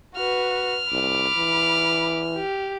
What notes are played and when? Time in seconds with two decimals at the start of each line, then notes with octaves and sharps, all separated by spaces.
0.16 F#4 B4 F6
0.92 C2 B5 D6
1.36 E3
2.35 G4